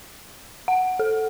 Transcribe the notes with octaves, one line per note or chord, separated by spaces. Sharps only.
F#5
A4